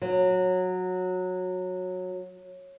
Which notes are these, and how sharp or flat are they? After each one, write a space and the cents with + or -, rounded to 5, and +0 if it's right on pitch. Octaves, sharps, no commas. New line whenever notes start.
F#3 -15